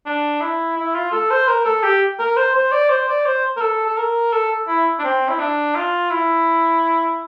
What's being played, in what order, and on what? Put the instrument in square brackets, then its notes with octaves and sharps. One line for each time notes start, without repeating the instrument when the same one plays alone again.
[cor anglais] D4
E4
E4
F4
A4
C5
A#4
A4
G4
A#4
C5
C5
D5
C5
D5
C5
A#4
A4
A4
A#4
A4
E4
D4
C4
E4
D4
F4
E4